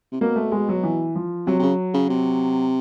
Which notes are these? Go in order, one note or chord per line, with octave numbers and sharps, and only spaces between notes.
C3
B2 A#3
A3
G#3
F#3
E3
F3
C3 F#3
C3
C#3
C#3
C3